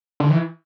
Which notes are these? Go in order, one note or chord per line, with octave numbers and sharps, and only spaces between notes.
D3
E3